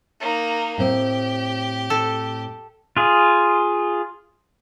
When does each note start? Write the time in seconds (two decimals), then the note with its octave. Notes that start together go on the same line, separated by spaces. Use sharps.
0.20 A#3 D#4
0.78 A2 C4 G4
1.90 A4
2.97 F4 G#4